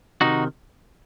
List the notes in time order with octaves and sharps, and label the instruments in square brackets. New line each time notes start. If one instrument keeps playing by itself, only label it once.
[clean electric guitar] C3 D#3 D#4 F#4